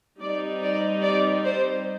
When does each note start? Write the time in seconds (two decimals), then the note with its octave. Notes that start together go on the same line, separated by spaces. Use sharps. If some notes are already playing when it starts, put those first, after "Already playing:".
0.20 G3 C4 D#4 D5
0.61 D5
1.02 D5
1.44 C5